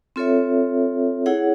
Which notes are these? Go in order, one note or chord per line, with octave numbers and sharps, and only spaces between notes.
C4 F4 A4 C#5 E5
E4 G#4 C#5 F#5